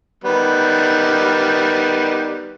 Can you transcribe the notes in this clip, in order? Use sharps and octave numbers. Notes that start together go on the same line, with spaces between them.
D#3 G3 B3